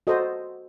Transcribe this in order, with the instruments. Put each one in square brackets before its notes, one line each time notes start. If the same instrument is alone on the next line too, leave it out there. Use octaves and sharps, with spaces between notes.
[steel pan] F#4 A4 C5 D#5